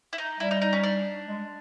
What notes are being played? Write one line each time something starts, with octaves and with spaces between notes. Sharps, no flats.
E4
D#4
G3 E4
D#4
D#4
C#4
D4
G#3